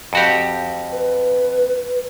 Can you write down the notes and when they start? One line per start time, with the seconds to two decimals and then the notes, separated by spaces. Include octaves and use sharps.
0.13 F2 F#4 G4
0.92 B4